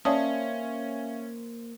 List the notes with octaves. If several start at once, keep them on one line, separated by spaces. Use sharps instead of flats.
A#3 C#4 C5 D5 E5 F5 A5 D#6